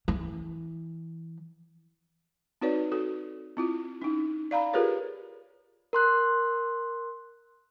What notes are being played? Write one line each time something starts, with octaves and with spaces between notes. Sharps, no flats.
E3
C4 D#4 F#4 B4 C#5 D5
F#4 A4
C4 E4 F4
C#4 D#4
D5 F5 A#5 B5
F4 G4 G#4 A#4 B4 C#5
A#4 C6 F#6